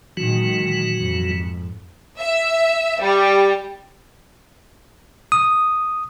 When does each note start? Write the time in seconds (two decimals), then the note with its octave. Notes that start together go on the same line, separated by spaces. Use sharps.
0.17 A#2 D#3 E3 F#3 G#3 F#4
0.94 F2 G#2
2.19 E5
3.01 G3
5.32 D#6